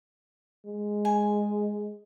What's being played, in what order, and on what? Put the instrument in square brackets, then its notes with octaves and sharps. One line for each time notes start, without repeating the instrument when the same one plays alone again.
[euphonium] G#3
[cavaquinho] G#5